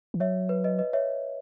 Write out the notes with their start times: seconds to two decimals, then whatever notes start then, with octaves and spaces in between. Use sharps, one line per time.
0.14 E3
0.20 F#3 C#5 E5
0.49 B4
0.64 B4 D#5
0.79 B4 D#5
0.93 C#5 E5